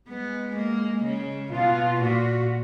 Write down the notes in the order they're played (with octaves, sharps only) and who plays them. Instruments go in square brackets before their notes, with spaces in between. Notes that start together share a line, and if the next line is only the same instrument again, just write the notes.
[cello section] G#3 [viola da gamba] B3
[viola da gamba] A#3
C#3
[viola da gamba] B2 [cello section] F4
[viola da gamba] A#2 [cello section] F#4